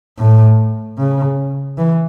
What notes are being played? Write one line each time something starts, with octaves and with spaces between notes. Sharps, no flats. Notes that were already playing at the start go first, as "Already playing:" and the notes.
A2
C#3
E3